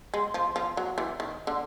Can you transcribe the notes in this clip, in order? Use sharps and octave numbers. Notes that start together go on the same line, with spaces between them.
G#3
F3
F3
F#3
E3
D#3
D3